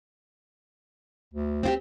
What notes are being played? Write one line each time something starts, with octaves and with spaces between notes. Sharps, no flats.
D2
C4 F4 G4